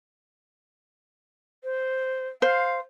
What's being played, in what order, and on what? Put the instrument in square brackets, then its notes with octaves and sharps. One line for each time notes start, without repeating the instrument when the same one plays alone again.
[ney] C5
[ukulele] C5 [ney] F5